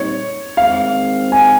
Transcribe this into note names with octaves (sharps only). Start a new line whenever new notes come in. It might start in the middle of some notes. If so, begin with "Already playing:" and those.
Already playing: A#2 G3 C4 D#4 C#5
D#3 G#3 C4 F5
G#5